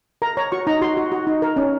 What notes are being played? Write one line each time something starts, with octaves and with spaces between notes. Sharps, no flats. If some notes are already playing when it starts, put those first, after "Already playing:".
A#4 A#5
C#5 A#5
F#4 C#6
D#4 A#5
F#4 C6
F#4
F#4
D#4
A#4
C#4